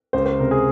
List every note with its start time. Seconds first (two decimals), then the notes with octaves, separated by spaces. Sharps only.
0.13 C#2 C5
0.26 C5
0.39 C3 A#4
0.51 G#4